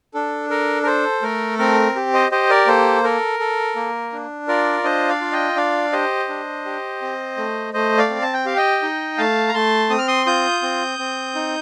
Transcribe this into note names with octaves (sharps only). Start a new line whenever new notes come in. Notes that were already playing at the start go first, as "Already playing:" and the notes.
D4 A4
A4 A#4
A#4
A4 C5
A3 A#4
C4 A#4
G4
C5 D#5
G4 C5 D#5
A#4 D5
A#3 A4 C5
A4 A#4
A4
A#3
D4
F4 A#4 D5
D4 C5 D#5
D5 F5
F4
D#5 G5
D4 D5 F5
G4 C5 D#5
D4
G4
C4
A3
A3 C5 D#5
D5 F5
C4
A5
G5
G4 F5
D#5 G5
D#4
A3 F5 A5
A#5
A3 A5 C6
C4 D#6
F6
C6 D#6
F4 D#6 G6
C4
C4
D#4